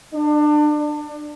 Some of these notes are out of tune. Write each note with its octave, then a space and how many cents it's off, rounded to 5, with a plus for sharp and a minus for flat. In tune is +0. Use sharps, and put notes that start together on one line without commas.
D4 +30
D4 +15